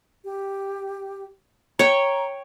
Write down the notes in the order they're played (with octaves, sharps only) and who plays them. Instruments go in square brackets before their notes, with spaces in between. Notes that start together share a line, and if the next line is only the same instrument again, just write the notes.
[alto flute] G4
[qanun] C#5 G5 [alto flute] A#5